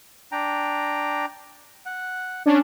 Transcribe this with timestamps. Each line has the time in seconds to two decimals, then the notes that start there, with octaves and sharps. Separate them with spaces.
0.32 D4 G5 A#5
1.86 F#5
2.46 C#4 D4